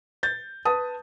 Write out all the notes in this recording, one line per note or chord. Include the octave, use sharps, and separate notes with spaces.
G6 A6
B4 A5 D#6